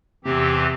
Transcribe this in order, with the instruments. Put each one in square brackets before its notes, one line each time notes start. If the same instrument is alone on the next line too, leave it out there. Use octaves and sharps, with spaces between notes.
[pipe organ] E2 E3 C4 G4 [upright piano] C3